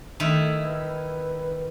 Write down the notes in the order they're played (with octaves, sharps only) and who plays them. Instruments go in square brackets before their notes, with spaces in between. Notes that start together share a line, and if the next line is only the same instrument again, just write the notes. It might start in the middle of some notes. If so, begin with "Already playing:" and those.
[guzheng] D#3 E4 [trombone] A3
[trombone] B4